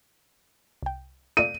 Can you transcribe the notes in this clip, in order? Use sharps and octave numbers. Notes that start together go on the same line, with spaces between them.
C2 G5
A3 F4 D5 D#7